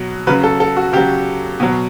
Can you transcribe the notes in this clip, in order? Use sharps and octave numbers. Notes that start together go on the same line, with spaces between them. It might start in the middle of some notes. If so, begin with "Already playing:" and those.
Already playing: B2 F#3
C#3 F#3 B4
A4
A4
F#4
C#3 F#3 G4
B2 F#3